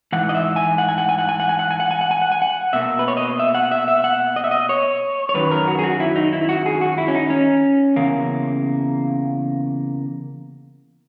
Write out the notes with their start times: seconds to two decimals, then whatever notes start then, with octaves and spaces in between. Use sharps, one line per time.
0.12 G#2 E3 F#5
0.29 D#5
0.35 E5
0.56 G#5
0.78 F#5
0.89 G#5
0.98 F#5
1.09 G#5
1.19 F#5
1.29 G#5
1.40 F#5
1.49 G#5
1.59 F#5
1.71 G#5
1.80 F#5
1.91 G#5
2.01 F#5
2.11 G#5
2.22 F#5
2.32 G#5
2.42 F#5
2.73 B2 A#3 E5
2.99 B4
3.08 C#5
3.17 D#5
3.39 E5
3.55 F#5
3.71 E5
3.88 E5
4.04 F#5
4.36 D#5
4.44 E5
4.51 D#5
4.69 C#5
5.29 C#5
5.34 F#2 D#3 F#3 B4
5.51 A#4
5.67 F#4
5.79 G#4
5.83 F#4
6.00 E4
6.16 D#4
6.33 E4
6.49 F#4
6.66 G#4
6.81 F#4
6.98 E4
7.08 C#4
7.15 D#4
7.30 C#4
7.96 E2 C#3 A#3